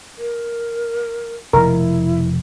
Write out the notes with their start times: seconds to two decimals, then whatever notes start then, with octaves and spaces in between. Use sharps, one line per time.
0.18 A#4
1.53 F1 B2 F3 E4 A#4